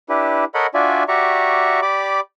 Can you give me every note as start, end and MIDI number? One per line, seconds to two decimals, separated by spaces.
0.09 0.44 62
0.09 0.44 64
0.09 0.44 67
0.09 0.44 71
0.54 0.67 69
0.54 0.67 70
0.54 0.67 73
0.54 0.67 75
0.54 0.67 78
0.54 0.67 83
0.74 1.04 62
0.74 1.04 65
0.74 1.04 66
0.74 1.04 74
0.74 1.04 76
0.74 1.04 80
1.08 1.80 66
1.08 1.80 67
1.08 1.80 74
1.08 1.80 76
1.08 1.80 82
1.08 1.80 85
1.82 2.20 67
1.82 2.20 74
1.82 2.20 83
1.82 2.20 86